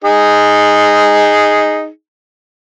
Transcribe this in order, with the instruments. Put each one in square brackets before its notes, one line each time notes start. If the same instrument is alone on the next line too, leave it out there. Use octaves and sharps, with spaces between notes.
[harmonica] D#4 G#4